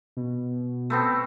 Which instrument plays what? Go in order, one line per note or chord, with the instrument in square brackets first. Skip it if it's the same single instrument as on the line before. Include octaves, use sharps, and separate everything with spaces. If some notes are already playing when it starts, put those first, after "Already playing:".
[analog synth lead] B2
[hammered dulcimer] A3 B3 C4